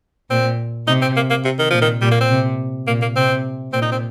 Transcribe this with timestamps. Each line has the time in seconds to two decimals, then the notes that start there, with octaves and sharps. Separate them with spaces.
0.30 A#2 C4
0.87 C3 D#4
1.02 C4
1.16 A#3
1.30 A#3
1.45 C3
1.59 D#3
1.71 A#2 F3
1.82 D#3
2.02 A#2 G3
2.11 A#3
2.21 C4
2.30 C3
2.87 A#2 A#3
3.02 A#3
3.16 C3 C4
3.73 A#2 C4
3.82 D#4
3.92 C4